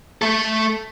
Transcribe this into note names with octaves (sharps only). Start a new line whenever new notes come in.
A3 A4